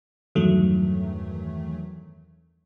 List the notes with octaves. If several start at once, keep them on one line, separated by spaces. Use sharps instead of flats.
E2 G2 D#3 E3 F#3 A3